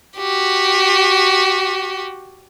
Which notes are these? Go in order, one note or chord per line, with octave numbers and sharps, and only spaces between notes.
F#4 G4